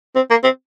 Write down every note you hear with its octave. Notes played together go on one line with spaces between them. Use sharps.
C4
A#3
C4